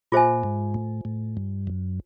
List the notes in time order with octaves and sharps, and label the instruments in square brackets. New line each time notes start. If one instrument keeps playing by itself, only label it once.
[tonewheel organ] A#2 [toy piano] F4 G#4 C5 E5 G#5
[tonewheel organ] G#2
A2
A2
G2
F#2